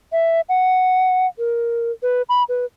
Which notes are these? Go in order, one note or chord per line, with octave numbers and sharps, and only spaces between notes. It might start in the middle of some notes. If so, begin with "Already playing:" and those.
E5
F#5
A#4
B4
B5
B4